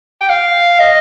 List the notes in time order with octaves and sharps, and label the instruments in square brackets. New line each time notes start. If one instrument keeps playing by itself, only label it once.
[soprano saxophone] G5
F5
D#5